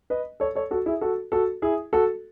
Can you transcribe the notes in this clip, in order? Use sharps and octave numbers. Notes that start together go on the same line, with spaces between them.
B4 D#5
A4 C#5
A4 C#5
F#4 A4
E4 G#4
F#4 A4
F#4 A4
E4 G#4
F#4 A4